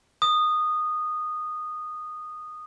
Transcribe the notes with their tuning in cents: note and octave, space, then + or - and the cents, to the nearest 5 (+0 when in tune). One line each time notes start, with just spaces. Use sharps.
D#6 -15